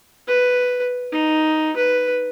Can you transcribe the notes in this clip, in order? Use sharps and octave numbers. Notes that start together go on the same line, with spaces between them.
B4
D#4
B4